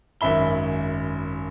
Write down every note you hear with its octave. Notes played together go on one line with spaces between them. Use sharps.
G#1 F#2 E5 B5 G7